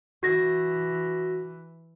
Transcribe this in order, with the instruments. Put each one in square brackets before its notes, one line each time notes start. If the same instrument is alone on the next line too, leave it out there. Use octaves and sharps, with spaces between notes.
[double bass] E3 [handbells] F#4 A#6